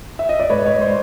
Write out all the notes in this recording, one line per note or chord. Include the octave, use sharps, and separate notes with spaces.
E5
D#5
D5
G#2 B4 C#5
C#5 D#5
G#2
C5 D5